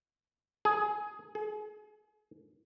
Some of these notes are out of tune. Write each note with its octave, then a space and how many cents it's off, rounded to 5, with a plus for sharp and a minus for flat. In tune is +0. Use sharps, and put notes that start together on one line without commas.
G#4 +10
G#4 +35